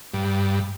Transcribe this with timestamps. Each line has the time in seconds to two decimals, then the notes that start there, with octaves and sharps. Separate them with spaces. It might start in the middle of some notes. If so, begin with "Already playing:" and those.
0.14 G2